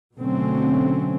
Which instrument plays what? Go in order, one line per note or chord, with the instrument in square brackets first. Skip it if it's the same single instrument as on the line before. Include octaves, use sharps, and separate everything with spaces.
[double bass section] B2 D3 F#3 A3 C4 C#4